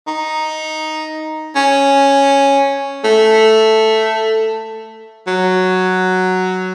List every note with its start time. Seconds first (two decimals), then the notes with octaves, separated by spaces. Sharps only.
0.08 D#4
1.56 C#4
3.04 A3
5.27 F#3